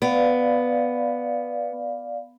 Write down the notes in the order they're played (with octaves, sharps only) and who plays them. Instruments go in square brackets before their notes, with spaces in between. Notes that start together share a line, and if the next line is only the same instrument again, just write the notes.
[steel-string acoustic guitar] B3 [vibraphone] D5 F5